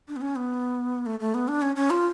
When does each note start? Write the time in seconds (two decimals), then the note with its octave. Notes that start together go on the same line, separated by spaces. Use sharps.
0.08 D4
0.16 B3
0.21 C#4
0.36 B3
1.06 A3
1.20 A3
1.34 B3
1.48 D4
1.62 C#4
1.76 C#4
1.90 F4